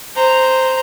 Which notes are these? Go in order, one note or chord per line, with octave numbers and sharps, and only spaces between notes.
C5 A#5